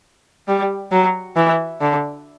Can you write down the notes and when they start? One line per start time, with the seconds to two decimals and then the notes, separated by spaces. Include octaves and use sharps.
0.48 G3
0.92 F#3
1.36 E3
1.81 D3